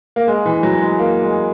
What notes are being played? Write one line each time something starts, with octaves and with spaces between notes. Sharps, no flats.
A#3
G#3
E3
F#3
G#3
A#3
G#3